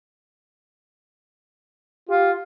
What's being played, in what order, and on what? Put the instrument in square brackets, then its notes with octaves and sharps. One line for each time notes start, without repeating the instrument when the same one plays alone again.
[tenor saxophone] F4 [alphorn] G4